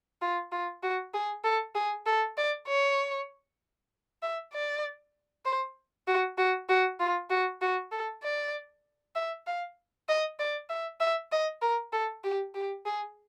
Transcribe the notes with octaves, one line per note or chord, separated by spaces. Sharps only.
F4
F4
F#4
G#4
A4
G#4
A4
D5
C#5
E5
D5
C5
F#4
F#4
F#4
F4
F#4
F#4
A4
D5
E5
F5
D#5
D5
E5
E5
D#5
A#4
A4
G4
G4
G#4